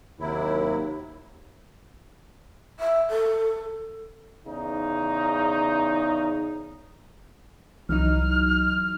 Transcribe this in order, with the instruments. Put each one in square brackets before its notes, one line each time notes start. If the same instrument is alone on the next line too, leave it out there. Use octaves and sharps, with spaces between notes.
[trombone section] D#2 [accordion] C3 F#3 E4
[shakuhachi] E5
A4
[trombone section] E2 C#3 D#4
[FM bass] C2 [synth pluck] E3 F#3 D#4 [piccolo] F6